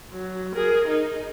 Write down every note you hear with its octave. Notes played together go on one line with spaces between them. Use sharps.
F#3
G#4 A#4
D#4